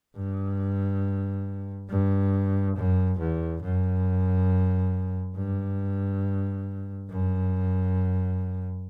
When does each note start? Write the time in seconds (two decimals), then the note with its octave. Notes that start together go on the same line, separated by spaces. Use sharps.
0.16 G2
1.90 G2
2.76 F#2
3.19 E2
3.63 F#2
5.36 G2
7.10 F#2